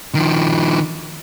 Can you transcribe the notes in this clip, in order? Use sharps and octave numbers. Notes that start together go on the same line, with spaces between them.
D#3 F3